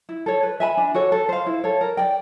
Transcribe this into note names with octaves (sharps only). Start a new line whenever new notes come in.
E4
A4 C#5
B4
E5 G#5 B5
D4
F#4 A4 C#5
A4
C5 F5
E4
A4 C#5
A#4
D5 G5